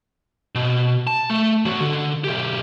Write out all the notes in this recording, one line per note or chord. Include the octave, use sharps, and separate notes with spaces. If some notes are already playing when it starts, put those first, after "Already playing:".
B2
A5
A3
E3 F#4
D3
B1 G4